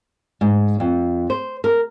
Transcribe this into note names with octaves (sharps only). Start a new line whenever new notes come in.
G#2
F2
C5
A#4